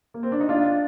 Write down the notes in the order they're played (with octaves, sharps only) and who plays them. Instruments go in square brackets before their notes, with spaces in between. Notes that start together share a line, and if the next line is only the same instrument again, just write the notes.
[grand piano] A#3
C4
D4
D#4
D4 F4